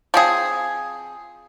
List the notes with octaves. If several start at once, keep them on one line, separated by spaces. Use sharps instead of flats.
F3 C4 G#4